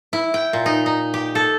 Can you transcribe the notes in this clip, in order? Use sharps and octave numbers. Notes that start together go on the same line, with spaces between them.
E4
G5
A#2
D#4
D#4
G4
A4